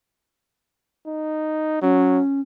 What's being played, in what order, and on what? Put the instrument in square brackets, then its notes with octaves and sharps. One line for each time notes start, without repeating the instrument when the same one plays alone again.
[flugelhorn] D#4
[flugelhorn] F#3 [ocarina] C#4